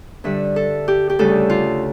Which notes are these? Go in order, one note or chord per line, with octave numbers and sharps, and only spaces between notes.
G2 D3 G3 E5
A4
G4
G4
D2 C#3 G3 A4
F4